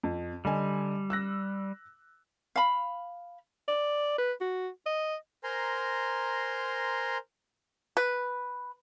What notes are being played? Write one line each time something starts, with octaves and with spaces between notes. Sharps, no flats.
F2
D3 G3 D#5 G#5
E6 F#6 A#6
F5 B5
D5
B4
F#4
D#5
A#4 C5 G#5 A#5 C6
B4